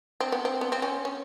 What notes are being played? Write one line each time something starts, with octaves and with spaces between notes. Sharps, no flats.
C4
B3
C4
B3
C4
C#4
C#4